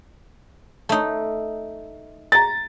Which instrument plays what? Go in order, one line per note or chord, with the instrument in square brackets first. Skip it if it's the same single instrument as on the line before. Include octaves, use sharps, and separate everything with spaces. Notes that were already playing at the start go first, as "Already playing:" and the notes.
[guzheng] A3 D#4
[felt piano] A#5 A6